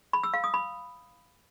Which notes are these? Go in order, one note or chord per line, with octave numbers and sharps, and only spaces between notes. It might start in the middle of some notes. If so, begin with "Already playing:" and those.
B5
E6
F5
D#6
B5